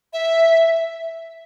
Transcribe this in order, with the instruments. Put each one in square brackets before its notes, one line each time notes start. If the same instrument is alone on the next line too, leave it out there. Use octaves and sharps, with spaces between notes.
[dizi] E5